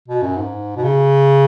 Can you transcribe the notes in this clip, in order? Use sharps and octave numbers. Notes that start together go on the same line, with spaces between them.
B2
F#2
G#2
B2
C#3